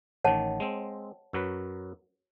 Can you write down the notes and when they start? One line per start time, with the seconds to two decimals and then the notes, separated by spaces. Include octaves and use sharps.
0.24 A1 D#3 C#5 F#5 A5
0.60 G#3 C4
1.33 F#2 F#3 B4